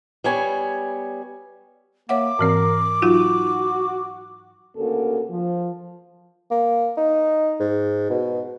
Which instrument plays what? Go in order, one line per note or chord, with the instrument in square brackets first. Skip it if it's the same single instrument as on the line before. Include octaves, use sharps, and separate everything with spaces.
[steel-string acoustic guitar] G3 B3 C#5 G#5
[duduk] A#3 [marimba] C#5 E5 F#5 [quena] D6
[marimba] G#2 E3 C4 [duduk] A#4
[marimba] F#3 D#4 F4 [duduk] F#4
[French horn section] D2 C#3 A#3 F#4 A4
F3
[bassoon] A#3
D#4
G#2
B2